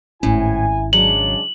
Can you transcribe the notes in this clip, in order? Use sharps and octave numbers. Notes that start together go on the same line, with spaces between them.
G#1 A2 C#4 E4 G#5
C#3 F#3 G#3 D4 F#7